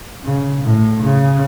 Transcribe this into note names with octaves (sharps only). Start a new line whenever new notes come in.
C#3
A2
C#3